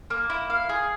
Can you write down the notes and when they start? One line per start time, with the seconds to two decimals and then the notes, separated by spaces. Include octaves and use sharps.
0.10 A#3
0.30 E4
0.50 F5
0.69 G#4